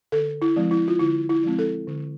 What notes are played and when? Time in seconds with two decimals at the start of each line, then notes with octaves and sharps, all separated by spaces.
0.12 D3 A4
0.42 E4
0.56 F3 G#3 C4
0.71 E4
0.88 F4
1.00 D3 E4
1.29 E4
1.43 F3 G#3 C4
1.59 A4
1.88 D3